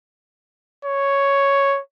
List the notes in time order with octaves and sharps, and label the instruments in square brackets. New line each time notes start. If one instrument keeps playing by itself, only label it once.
[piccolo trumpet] C#5